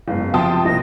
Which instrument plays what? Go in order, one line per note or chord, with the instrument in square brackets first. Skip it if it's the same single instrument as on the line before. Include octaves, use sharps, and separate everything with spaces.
[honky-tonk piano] F#1 G#2 B3 [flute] F5
[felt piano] C3 F3 [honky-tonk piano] G5 A5 D#6 [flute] C6
[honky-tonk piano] C2 A#3 [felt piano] D#4 [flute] A#6